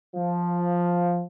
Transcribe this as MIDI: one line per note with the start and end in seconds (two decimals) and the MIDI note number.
0.16 1.22 53